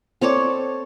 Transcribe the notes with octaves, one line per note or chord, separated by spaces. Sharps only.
C4 A4 C#5 D5